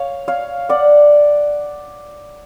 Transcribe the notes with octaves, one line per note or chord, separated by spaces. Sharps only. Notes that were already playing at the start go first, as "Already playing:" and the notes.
Already playing: C#5 F5
C#5 F5
D5 F#5